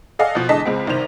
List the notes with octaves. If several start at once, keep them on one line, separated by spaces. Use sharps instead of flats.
A4 D5 D#5 F5 F#5 G#5
B2 F3
E2 D3 G#3 D#5 A5 B6
C#2 G#3 C4
C2 D#3 C5 F7